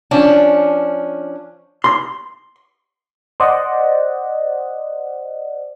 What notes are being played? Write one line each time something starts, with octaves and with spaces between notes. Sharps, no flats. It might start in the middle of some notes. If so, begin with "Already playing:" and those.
F3 C#4 D4
C6
C5 D5 D#5 F#5